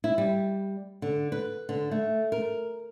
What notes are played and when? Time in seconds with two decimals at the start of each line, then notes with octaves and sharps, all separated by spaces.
0.04 E4
0.18 G3
1.02 D3
1.32 B4
1.69 D3
1.91 A3
2.32 A#4